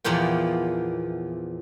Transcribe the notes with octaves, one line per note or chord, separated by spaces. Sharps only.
E2 A#2 F3 B3 G5